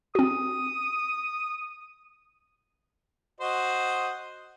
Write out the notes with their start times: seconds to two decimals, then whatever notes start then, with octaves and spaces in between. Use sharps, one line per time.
0.15 C4 F#4 D#6
3.40 F#4 C5 D#5